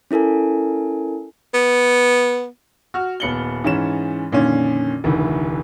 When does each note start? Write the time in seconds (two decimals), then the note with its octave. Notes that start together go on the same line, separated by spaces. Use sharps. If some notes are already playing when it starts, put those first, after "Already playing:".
0.11 C#4 E4 A4 A#4 G#5
1.54 B3
2.94 F#4 F6
3.20 D#1 B3 C#7 F#7 G7
3.64 G#2 E3 C#4 E7
4.32 F2 A#2 D3 D#3 C#4
5.04 F1 D2 D#3 E3